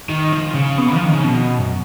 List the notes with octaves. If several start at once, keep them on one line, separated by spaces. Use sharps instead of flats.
D#3
F3
C#3
B2
F3
D#3
C#3
B2
F#2